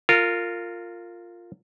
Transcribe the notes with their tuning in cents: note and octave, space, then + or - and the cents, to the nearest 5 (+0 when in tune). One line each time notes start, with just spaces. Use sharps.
F4 +0 A#4 -25